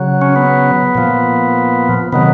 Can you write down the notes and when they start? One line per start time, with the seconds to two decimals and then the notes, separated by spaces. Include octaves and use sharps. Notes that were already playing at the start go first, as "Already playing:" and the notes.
Already playing: C#3 F#3
0.22 C#4
0.36 B3
0.95 A#2 F3
2.13 C3 D#3 F#3 B3